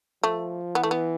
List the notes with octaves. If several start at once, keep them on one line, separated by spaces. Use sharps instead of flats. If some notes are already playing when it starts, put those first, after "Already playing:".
F3 A3
E3 B3
A3
B3